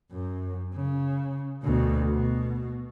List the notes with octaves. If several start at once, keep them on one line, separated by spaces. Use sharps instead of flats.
F#2
C#3
D2 B2
B2